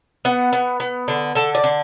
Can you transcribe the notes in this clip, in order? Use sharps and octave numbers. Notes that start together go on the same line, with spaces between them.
B3 F#5
B3
B3
D3
D3 A4
D5
D3